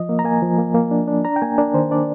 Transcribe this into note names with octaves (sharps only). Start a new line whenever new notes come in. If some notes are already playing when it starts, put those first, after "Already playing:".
Already playing: F3 D#5
A#3
A#5
A#3 G#5
F3
A#3
A#3
D4
D4
D4 A#5
G5
A#3 G#5
D4 A#4
D#3 C5
D4 D5